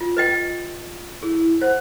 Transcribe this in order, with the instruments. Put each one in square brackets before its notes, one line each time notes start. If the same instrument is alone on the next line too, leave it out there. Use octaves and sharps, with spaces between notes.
[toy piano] F4
B4 D#5 G5
[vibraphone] E4 [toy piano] G#4
[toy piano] C5 [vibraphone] F#5